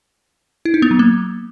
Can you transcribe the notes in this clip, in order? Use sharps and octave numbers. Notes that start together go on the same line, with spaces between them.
E4
D#4
B3
F#3
A#3